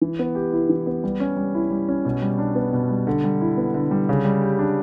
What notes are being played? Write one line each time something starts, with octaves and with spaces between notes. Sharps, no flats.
E3
B3
G4
E4
E3
B3
G3
C#4
G3
E4
G3
C#4
B2
G3
D4
B3
B2
G3
D3
G3
E4
B3
D3
G3
C#3
G3
G4
D4